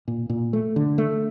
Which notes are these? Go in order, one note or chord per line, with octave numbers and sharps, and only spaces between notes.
A#2
A#2
A3
D3
A3